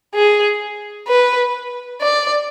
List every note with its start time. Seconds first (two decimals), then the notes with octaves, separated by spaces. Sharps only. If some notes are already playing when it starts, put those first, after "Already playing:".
0.15 G#4
1.08 B4
2.01 D5